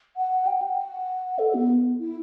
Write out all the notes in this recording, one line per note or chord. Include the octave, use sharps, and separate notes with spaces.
F#5
G5
F#5
A4
B3
E4